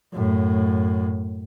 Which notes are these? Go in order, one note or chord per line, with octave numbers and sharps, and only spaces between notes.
F#2 A2